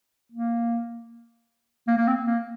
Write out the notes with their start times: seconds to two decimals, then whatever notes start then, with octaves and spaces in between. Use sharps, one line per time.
0.32 A#3
1.88 A#3
1.98 A#3
2.08 C4
2.26 A#3